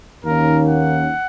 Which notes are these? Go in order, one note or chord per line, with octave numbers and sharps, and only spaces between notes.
D#2 D#3 A#3 C#4 A#4
F#5